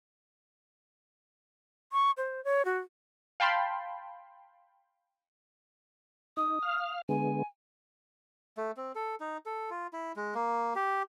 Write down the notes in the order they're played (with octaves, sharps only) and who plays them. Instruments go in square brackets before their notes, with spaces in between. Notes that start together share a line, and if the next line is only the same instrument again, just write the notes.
[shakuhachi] C#6
C5
C#5
F#4
[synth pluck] F5 G5 A5 B5 C6
[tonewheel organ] D#4 [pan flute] D#6
[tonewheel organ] F5 F6
[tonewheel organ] D3 G#3 B3 [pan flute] G#5
[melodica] A3
C4
A4
D#4
A4
F4
E4
G#3
A#3
G4